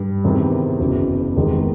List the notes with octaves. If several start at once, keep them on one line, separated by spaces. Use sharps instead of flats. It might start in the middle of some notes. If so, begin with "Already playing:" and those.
Already playing: G2
E2 C3 D#3
F#1 E2 C#3 F#3
F1 E2 C3 D#3 G#3